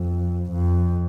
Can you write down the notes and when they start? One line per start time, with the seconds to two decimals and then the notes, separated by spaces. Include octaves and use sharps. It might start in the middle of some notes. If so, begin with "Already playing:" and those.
Already playing: F2
0.51 F2